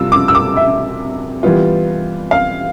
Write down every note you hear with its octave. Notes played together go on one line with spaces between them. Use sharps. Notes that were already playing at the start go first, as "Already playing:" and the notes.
Already playing: C3 G3 F4 E6
D6
E6
D6
E5
E3 G3 B3 F4
F5